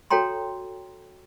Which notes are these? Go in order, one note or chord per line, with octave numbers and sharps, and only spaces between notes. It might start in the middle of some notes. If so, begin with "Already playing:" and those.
F#4 A4 C#5 G5 A#5 C6